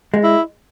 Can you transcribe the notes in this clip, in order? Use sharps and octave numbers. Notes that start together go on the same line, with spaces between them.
G#3
E4